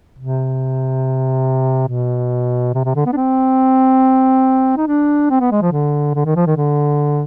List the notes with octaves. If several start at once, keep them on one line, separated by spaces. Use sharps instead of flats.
C3
B2
C3
C3
D3
B3
D4
C4
D#4
D4
C4
B3
G#3
F3
D3
D3
D#3
F3
D#3
D3